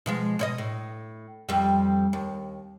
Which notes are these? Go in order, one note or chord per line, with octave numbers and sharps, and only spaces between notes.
B2 F3 G#3
B2 C#5 D#5
A2
F2 G3
D#2